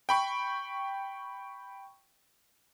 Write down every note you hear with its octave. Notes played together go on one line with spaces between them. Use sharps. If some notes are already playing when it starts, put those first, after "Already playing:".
G5 B5 C#6